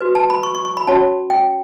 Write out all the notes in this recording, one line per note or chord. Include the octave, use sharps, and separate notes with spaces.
F#4 B4
A5
B5
C#6
C#6
C#6
B5
C#4 F#4 C#5 A5
G5